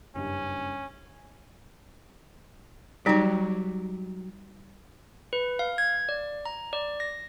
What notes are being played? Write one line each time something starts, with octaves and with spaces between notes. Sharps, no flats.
F#1 G2 G3 C#4
F#3 G3 D#4 G4
B4
F5
G#6
D5
A#5
D5
A#6